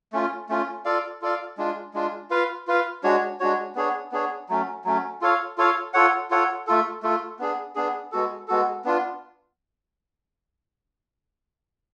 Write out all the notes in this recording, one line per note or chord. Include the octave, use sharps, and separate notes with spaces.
A3 C#4 F4
A3 C#4 F4
F4 A4 D5 F5
F4 A4 D5 F5
G#3 D4 F4
G#3 D4 F4
F4 B4 F5
F4 B4 F5
G#3 D4 F#4 C#5
G#3 D4 F#4 C#5
B3 D4 G#4 C#5
B3 D4 G#4 C#5
F#3 A3 C#4
F#3 A3 C#4
F4 A4 C#5 F5
F4 A4 C#5 F5
F4 A4 C#5 F#5
F4 A4 C#5 F#5
A3 F4 A4
A3 F4 A4
B3 D4 G#4
B3 D4 G#4
G#3 B3 F#4 A4
G#3 B3 F#4 A4
B3 D4 F4